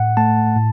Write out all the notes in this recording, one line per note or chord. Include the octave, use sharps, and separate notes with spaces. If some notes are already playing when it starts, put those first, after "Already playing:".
Already playing: A2 F#5
A3 A5
A2